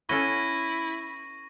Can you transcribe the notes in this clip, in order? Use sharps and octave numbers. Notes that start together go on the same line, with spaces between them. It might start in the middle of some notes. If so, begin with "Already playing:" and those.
B3 C#4 E4 A4 C#6 A#6 D#7